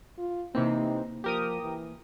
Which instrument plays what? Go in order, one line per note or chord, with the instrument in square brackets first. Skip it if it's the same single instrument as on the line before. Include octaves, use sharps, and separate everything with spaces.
[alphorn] F4
[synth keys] C3 E3 C4 [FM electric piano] A#3 [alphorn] D#4
[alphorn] F3 [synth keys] G4 A#4 D#6
[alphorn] E3